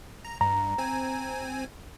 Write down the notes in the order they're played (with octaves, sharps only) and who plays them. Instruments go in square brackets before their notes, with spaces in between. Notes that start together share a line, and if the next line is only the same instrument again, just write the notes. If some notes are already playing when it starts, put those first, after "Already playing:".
[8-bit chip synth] A#5
[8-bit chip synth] G2 [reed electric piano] A#5
[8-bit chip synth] C4 G#5